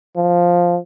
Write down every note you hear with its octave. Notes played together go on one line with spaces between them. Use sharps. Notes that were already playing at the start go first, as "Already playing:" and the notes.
F3